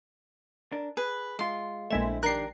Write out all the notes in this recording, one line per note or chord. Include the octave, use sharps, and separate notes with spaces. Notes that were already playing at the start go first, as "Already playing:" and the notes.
D4 A#4
G#4 B4
G#3 F4 C6
A#1 G#3 A3 C4 E4 E5
D#3 D4 G4 A#4 F#6 C7